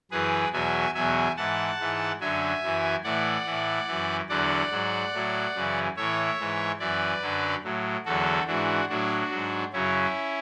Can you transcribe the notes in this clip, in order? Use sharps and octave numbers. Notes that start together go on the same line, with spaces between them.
F#2 E3 G#4 B4
E2 B2 F#3 E5 G#5
E2 B2 F#3 E5 G#5
G#2 E3 F#5 A5
G#2 E3
F#2 D3 F#3 E5 G#5
F#2 E3
A2 E3 D5 F#5
A2 E3
F#2 E3
E2 D3 F#3 D5 F#5
G#2 F#3
A2 F#3
F#2 C#3 E3
A2 E3 C#5 E5
G#2 E3
F#2 E3 B4 D5
F#2 D3 F#3
A2 F#3
E2 D3 F#3 F#4 A4
G#2 E3 D4 F#4
A2 F#3 D4 F#4
G#2 F#3
F#2 C#3 F#3 C#4 E4